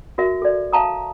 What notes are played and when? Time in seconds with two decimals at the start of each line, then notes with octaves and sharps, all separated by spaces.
0.18 F#4 A#4 E5
0.42 A4 D5
0.73 E5 F5 A5 A#5 D#6